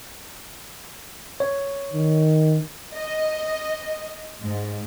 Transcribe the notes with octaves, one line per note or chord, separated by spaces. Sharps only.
C#5
D#3
D#5
G#2